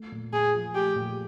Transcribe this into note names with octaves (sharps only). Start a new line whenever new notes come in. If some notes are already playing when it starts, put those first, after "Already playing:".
Already playing: A3
A#2
A#2 G#4
F3
A3 G4
A#2